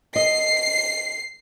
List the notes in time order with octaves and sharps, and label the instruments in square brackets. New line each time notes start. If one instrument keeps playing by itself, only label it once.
[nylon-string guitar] D#5 [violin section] C7